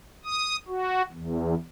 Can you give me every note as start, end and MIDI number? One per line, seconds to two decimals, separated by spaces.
0.25 0.56 87
0.68 1.02 66
1.12 1.55 40